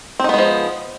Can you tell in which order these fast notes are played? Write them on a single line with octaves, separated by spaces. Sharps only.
C4 D#4 B3 G#3 F3